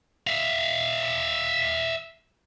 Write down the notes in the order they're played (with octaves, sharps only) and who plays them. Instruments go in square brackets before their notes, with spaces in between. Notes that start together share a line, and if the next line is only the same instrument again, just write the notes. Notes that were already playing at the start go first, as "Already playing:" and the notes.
[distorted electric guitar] E5 F5